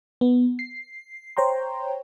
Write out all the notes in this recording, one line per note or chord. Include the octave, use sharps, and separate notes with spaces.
B3
C7
C5 C#5 G5 A#5 C6